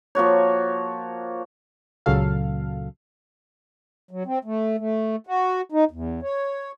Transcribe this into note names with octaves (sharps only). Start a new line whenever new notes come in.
F3 A#3 F#4 C#5
C#2 A#2 C#3 F#3 A4 F5
F#3
C4
A3
A3
F#4
D#4
E2
C#5